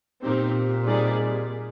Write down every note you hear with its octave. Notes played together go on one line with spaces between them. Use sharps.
A#2 C4 D#4 G4
G3 C4 D#4 G#4 D5